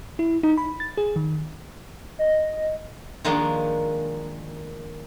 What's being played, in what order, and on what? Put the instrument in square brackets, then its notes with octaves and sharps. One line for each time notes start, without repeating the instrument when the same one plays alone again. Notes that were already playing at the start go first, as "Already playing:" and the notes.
[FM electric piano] E4
D#4
B5
A6
G#4
D#3
[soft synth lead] D#5
[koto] D#3 F3 G#3 A#3 D4